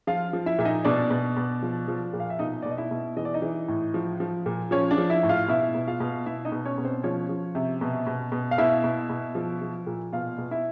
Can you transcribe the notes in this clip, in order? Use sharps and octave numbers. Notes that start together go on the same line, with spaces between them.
F3 F4 F5
F3
E4 E5
A#2 E5
D#4 D#5
B2 D4 D5
B2
B2
F3
F3
A#2
F5
E5
B2 D#4 D#5
D5
B2
D#5
E4 E5
B2
E3 D#5
D5
D#4 D#5
E3
A2
F3
F3
A#2
F3 C#4 C#5
D4 D5
F3
E4 E5
A2
F4 F5
B2 E4 E5
B2
F4 F5
B2
B2 E4 E5
D#4 D#5
B2
C#4 C#5
B2
C4 C5
F3 C#4 C#5
F3
C3
B2
B2
B2
F5
B2 E4 E5
B2
B2
F3
F3
A#2
B2 F4 F5
B2
E4 E5